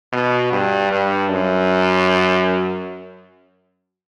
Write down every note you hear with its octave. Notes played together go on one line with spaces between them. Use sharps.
B2
G2
G2
F#2